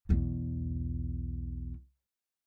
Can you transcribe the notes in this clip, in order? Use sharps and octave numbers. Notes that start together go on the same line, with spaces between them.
B1 E2